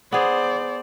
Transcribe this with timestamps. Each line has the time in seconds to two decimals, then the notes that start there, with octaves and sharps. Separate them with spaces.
0.12 B3 G#4 C5 D5